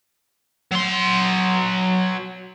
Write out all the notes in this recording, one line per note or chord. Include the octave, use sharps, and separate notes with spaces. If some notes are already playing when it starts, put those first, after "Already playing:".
F#3 C6